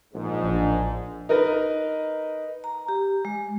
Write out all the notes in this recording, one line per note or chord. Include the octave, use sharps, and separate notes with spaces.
A#1 G#2
A1 F3 D4
D#4 A#4 B4 D#5
A#5
G4
G#3